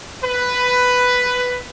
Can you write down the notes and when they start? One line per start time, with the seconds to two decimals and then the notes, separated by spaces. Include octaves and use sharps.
0.23 B4